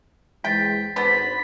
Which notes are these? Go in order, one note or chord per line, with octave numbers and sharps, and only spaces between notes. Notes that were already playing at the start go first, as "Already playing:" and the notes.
E2 G#3 C5 G5 A6 B6
G#1 D3 B3 C5 B5